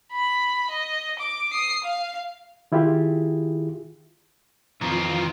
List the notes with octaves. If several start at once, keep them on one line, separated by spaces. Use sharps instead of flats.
B5
D#5
D6
D#6 C7
F5
D#3 E4 F4 G4 G#4
F2 D#3 E3 C4 F4